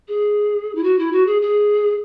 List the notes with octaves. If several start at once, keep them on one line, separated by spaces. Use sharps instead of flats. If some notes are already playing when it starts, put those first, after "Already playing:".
G#4
E4
F#4
E4
F#4
G#4
G#4